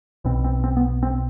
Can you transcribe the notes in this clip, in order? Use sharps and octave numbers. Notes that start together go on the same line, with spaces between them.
B1 B2 C4
C4
C4
B3
C4